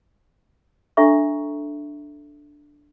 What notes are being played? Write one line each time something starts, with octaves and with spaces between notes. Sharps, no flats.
D4 A4 E5 A#5 C#6